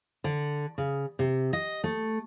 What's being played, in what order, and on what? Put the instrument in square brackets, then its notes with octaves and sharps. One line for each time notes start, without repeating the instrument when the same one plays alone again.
[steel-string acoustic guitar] D3
C#3
C3
D#5
A3